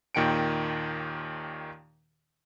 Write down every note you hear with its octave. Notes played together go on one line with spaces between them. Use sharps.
D#2 A#2 D#3 G5 C#7 D7